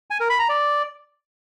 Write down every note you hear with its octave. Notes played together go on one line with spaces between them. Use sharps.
G#5
A#4
B5
A#5
D5